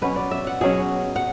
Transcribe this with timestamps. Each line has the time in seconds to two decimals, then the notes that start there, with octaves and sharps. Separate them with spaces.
0.02 B2 F#3 C#4 B4
0.16 D5
0.31 E5
0.47 F#5
0.61 B2 F#3 C#4 G#4
1.16 F#5